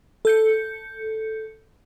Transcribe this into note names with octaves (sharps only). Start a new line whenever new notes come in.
A4 G6 C#7